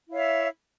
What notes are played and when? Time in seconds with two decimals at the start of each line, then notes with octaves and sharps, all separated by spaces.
0.08 E4
0.10 F5
0.13 C#5
0.16 E5